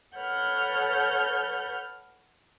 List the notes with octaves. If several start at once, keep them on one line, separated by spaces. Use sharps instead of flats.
A4 B4 C#5 F#5 F6 G6